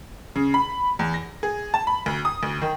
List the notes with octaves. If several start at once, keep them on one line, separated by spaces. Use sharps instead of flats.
C#3
B5
E2
A#6
G#4
A5
B5
D2
D#6
D2
D#3